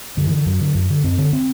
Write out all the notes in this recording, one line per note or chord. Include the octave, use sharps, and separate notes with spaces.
F#2 D3
E3
D3
F#2 F#3
D3
F#2
D3
F#2 C4
D3
C4